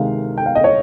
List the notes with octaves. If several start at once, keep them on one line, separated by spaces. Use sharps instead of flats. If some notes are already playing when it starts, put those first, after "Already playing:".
Already playing: C3 D#3 G#3 F5
G5
F5
D#5
C#5